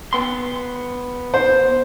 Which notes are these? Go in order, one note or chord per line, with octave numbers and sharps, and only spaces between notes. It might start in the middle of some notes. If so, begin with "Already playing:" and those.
B3 C6
C5